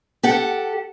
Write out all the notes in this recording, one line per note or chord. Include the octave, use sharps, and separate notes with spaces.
G4 A4 F#5